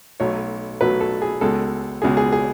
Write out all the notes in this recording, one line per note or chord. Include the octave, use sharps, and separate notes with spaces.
B1 B2 F#3 A3 C#5
B1 B2 F#3 A3 B4
A4
G#4
C#2 B2 G#3 A4
C#2 B2 G#3 G#4
G#4
G#4